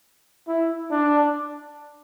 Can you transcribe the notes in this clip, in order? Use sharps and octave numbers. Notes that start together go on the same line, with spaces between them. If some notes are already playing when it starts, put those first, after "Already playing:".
E4
D4